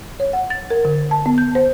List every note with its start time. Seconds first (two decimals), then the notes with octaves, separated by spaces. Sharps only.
0.20 C#5
0.33 F#5
0.50 A6
0.70 A#4
0.85 D3
1.11 A5
1.26 B3
1.38 G6
1.55 C5